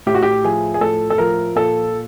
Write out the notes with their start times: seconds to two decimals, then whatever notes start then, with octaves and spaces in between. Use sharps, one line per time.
0.06 A2 G4
0.15 F#4
0.23 G4
0.44 F3 G#4
0.74 G#4
0.81 A2 A4
1.10 A4
1.18 F3 A#4
1.56 A#2 A4